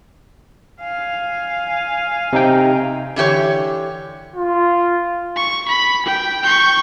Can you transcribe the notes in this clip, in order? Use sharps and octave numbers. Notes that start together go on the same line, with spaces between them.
F5 G#5
C3 D#4 G5
D3 E3 G4 C#5
F4
C#6
B5
G5
C#6 G6